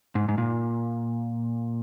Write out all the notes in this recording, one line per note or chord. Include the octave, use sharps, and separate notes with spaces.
G#2
G#2
A#2